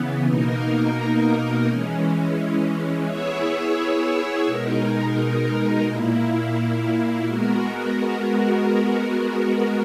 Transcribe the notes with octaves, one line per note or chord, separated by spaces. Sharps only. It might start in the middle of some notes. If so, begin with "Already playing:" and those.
Already playing: C#3 E3 B3
B2 A#3 D#4 A#4
E3 G#3 C#4
B3 E4 G#4 C#5 E5
B2 G#3 D#4 A#4
A#2 A#3 E4
G#3 B3 F#4 A#4